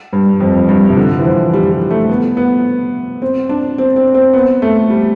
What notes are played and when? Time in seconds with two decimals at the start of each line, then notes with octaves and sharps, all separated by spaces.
0.13 G2
0.40 F2
0.69 G2
0.90 C3
0.97 D3
1.19 E3
1.24 F3
1.54 G3
1.72 G3
1.90 A3
2.09 B3
2.37 B3
3.22 C4
3.49 D4
3.78 C4
3.96 C4
4.15 C4
4.33 B3
4.62 A3
4.90 G3